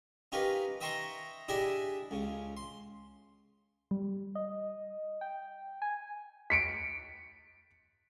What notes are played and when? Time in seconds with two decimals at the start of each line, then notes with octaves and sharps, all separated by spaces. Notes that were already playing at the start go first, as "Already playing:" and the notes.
0.32 C#4 D#4 F4 G4 A#4 B4
0.81 D#5 E5 G5 A#5 C6 C#6
1.48 D4 E4 G4 G#4 D#5 E5
2.11 C#2 C#3
2.57 C6
3.91 G3
4.35 D#5
5.21 G5
5.82 G#5
6.50 B6 C#7 D7